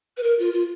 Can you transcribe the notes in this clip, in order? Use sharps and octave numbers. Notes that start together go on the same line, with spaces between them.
B4
A#4
F4
F4